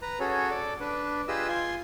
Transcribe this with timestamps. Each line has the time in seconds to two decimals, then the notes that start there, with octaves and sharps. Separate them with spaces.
0.02 B4 A#5
0.20 C#4 F#4 G#4 A4 C#5
0.51 A4 D5
0.80 D4 B4
1.28 F4 G4 G#4 B4 D#5 E6
1.48 F4 G#5 C6